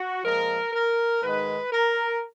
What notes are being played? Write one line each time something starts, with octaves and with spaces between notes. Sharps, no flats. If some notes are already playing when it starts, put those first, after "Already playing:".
Already playing: F#4
A#2 F3 G#3 A#4
A#4
G#2 D#3 G#3 B4
A#4